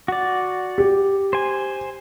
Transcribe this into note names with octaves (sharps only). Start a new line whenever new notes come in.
F#4 D5
G4
C5 G#5